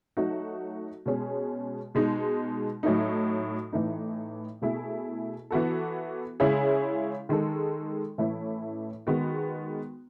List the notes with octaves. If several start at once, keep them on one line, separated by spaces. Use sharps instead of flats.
F#3 A3 D#4 F#4
B2 G#3 C#4 G#4
B2 G#3 D#4
A2 F#3 A3 D#4
A2 E3 A3 D#4
B2 A3 E4 G#4
E3 B3 F#4 A4
C#3 G#3 C#4 E4 G#4
D#3 G#3 D#4 A4
A2 E3 A3 C#4 E4
D#3 G#3 B3 F#4